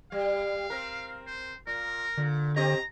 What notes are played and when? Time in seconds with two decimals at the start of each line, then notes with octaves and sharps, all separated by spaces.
0.12 G3 F5
0.70 C4 A#4
1.27 C5
1.67 A#2 A#4
2.17 A#2 D3
2.56 C4 G4 D#5 A#5